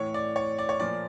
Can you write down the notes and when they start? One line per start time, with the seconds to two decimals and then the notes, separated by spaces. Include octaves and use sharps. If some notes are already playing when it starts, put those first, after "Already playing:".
Already playing: A2 E3 C#5
0.14 D5
0.36 C#5
0.59 D5
0.69 C#5
0.80 A#2 F3 D5